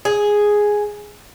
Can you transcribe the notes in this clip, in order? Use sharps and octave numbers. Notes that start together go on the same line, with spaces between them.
G#4